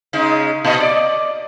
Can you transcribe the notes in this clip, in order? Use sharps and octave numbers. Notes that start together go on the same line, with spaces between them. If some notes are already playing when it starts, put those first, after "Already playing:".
C#3 G#3 D#4
A#2 D#5
D5